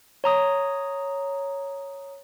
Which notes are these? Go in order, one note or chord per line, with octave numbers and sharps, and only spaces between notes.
C#5 A#5 D#6